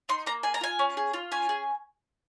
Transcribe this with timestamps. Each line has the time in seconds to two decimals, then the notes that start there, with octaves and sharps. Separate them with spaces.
0.09 D#4 C6
0.26 A#3 A#5
0.43 G#4 G#5
0.54 A#5
0.61 F4 G#5
0.79 C#4
0.97 G#4
1.14 F4
1.32 C#4 G#5
1.49 G#4